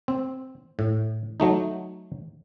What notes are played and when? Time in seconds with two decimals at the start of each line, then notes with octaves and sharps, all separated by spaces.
0.08 C4
0.79 A2
1.40 F#3 A3 D#4